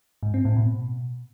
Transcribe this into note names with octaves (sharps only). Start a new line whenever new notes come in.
G#2
C4
A2
B2